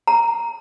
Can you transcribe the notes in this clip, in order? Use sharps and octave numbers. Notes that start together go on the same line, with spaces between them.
A#5